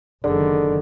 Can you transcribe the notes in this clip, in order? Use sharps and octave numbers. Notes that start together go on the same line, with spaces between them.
F#1 D3 D#3 G#4 A4 D5